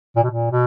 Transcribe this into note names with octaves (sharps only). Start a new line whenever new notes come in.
A#2
B2
A#2
B2